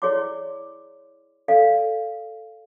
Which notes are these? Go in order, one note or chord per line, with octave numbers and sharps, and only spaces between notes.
E4 G#4 C#5 D5 C6 D6
A4 D5 F5